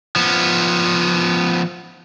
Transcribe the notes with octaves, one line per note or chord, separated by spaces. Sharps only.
F3 B3